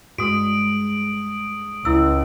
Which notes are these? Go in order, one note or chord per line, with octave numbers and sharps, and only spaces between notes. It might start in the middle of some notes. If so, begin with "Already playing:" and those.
G2 G#3 F#4 D#6 D7
C#2 E4 E6